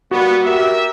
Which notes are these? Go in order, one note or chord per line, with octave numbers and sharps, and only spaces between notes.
G3 A#3 B3 F#4
G4 A#4 E5